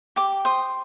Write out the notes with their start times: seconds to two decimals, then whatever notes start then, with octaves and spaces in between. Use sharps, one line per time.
0.16 G4 D6
0.45 C5 D#6